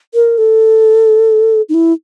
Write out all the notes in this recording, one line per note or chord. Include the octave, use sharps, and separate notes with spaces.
A#4
A4
D#4
E4